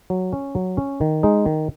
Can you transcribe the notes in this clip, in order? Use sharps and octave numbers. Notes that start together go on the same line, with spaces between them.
F#3
C#4
F#3
C#4
D#3
G#3 D#4
D#3